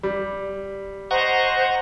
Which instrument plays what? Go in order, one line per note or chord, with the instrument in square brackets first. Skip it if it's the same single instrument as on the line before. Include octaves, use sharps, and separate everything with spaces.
[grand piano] G3
[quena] C5 [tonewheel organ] D#5 A#5 C#6 [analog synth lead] F#5